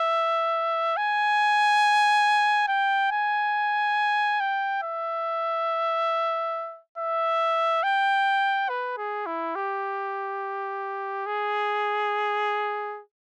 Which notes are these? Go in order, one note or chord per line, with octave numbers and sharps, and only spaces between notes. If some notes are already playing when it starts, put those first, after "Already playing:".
Already playing: E5
G#5
G5
G#5
G5
E5
E5
G5
B4
G#4
E4
G4
G#4